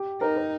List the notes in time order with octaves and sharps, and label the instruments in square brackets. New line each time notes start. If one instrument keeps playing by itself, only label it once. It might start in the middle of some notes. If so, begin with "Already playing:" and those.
Already playing: [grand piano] G4
[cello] D#4 [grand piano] A#4
[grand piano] A#4